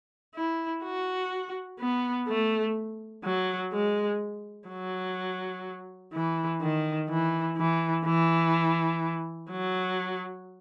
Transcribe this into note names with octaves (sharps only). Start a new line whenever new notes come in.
E4
F#4
B3
A3
F#3
G#3
F#3
E3
D#3
E3
E3
E3
F#3